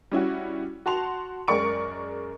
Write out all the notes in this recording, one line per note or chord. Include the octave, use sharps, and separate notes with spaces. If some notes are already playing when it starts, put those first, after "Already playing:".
G3 C#4 E4 F#4
F#4 A5 C6 F7
F#2 G#3 A#4 D5 C#6 D7